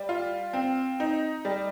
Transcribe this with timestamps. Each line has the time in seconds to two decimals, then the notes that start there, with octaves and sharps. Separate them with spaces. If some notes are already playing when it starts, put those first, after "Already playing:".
Already playing: G3
0.09 F4
0.53 C4
1.00 D#4
1.45 G3